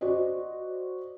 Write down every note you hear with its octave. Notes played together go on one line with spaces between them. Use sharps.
F#4 C5 D5 D#5